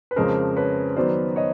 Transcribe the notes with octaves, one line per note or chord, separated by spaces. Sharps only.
B4
F2 C#3 F3 G#3 C#4 A#4 C5
B4 C#5
D#3 F#3 B3 C5 D5
C#5 D#5